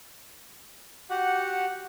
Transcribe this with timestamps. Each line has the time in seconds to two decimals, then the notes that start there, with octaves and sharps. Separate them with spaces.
1.10 F#4 G4 F#5